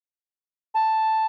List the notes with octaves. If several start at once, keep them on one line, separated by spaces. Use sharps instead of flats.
A5